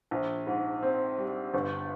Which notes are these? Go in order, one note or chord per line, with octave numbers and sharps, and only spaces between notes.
A#1
G#2
C4
G3
G1